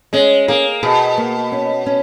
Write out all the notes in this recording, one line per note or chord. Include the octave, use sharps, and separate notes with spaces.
G#3 C#4
A#3 G#4
B2 G#4
A#3
C#4
C#4